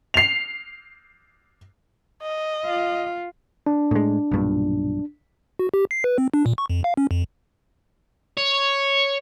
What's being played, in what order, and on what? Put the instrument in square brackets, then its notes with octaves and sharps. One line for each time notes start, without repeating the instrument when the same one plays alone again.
[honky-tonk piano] C7 F7
[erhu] D#5
[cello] F4
[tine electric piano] D4
[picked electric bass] A2 G#3
B1 G2 A#2
[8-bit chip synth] F#4
G4
C7
B4
C4
D4
A#2
C#6
F2
F5
C#4
F2
[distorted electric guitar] C#5